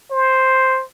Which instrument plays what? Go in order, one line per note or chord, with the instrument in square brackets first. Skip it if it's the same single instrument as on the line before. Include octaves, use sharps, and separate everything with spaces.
[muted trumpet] C5